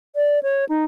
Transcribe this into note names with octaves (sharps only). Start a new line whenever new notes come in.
D5
C#5
D#4